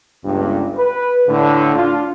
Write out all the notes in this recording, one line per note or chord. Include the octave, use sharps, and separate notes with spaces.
G1 C#2 G2
B4
A2 D3
D4 F4